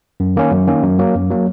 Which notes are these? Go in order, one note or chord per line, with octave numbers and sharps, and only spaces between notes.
F#2
D#3 A#3 C#4
F#2
D#3 A#3 C#4
F#2
F#3 A#3
F#2
F#3 A#3